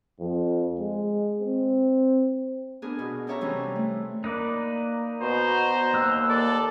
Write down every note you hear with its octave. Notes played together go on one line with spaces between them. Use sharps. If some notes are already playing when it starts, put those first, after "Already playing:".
F2
G#3
C4
B3 D4 G#4 A#4
B2
C#4 G4 A4 C#5 E5 A#5
C3 E3 G3 C#4
A3
A#3 D#4 B4 D5
B2 C5 A#5
D#2 A#3 E6 F#6
A4 D5